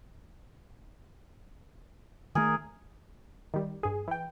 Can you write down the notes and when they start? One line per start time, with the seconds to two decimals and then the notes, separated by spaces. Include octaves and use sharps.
2.35 D#3 A3 G#4 A#4
3.54 D#3 G3
3.83 G2 G#4
4.08 E3 G5